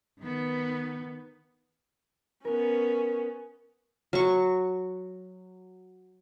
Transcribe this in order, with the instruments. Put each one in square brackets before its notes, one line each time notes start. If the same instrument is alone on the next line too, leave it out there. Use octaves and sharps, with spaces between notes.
[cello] D#3 B3
[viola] B3 C#4 [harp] A#4
[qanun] F#3 C#6